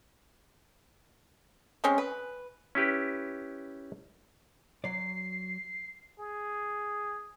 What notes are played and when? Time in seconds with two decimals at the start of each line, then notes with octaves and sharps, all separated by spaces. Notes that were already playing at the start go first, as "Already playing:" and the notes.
1.84 G#3 C4 C#4
1.98 B4
2.75 C#4 E4 G4 B4
4.84 F#3 D5 C7
6.19 G#4